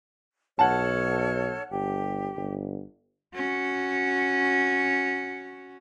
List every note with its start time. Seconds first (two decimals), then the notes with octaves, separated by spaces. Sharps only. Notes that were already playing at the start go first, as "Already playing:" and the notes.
0.59 B1 A4 C#5 F#5 A5 F6
1.71 G1 G4
2.36 G1
3.34 C#4 F#4